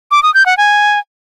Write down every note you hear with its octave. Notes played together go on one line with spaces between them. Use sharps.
D6
D#6
G6
F#5
G#5